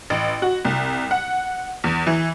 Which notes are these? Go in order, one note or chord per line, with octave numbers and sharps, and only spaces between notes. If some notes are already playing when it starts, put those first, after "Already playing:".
A1
F#4
C2
F#5
E2
E3